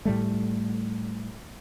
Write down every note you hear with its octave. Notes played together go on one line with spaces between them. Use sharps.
A2 G3 A3